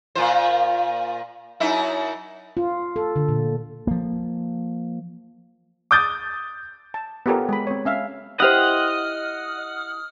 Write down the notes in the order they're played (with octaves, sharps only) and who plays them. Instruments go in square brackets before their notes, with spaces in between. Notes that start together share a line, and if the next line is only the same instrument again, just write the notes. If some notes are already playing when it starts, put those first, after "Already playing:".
[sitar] A#2 F4 C5
F#2 D#4 E4
[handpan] F4
A4
D3
A#2
[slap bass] F3 A#3
[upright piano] D6 D#6 G6 A6
[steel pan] A5
B3 F4 G4 A4 A#4 C#5
G#3 B5
C4 C#5
C#4 E5 F5
[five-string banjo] E4 G4 C5 [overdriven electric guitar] D#5 [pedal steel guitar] F#5 [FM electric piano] D#6 F6